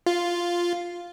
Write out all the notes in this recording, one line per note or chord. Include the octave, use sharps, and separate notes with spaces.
F4